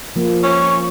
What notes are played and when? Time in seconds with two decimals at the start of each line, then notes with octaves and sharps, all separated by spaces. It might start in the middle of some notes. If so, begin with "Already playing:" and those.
0.16 F3 A#3 F4
0.43 C#4 C#6